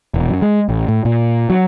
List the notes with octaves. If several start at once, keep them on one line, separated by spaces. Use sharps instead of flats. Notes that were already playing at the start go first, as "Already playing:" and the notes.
E1
F#2
G#3
A1
A2
A#2
F#3